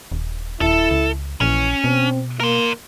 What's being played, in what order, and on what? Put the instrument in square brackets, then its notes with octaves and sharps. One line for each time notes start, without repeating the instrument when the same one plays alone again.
[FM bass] D#1
[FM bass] D#1 [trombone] E4 [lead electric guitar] A4
[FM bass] C#2
[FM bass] A#1 [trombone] E3 [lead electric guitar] C#4
[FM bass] B2 [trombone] C4
[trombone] A#3 [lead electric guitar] A#4 C6